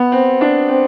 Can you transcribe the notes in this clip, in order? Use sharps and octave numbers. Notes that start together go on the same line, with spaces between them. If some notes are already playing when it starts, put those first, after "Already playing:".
Already playing: B3
C4
D4
C4